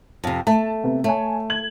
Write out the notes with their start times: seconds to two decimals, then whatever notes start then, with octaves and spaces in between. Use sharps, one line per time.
0.24 F2 C3
0.47 A3 A5
0.84 C3 B3
1.04 A3 C#5 G#5
1.50 G#6 F#7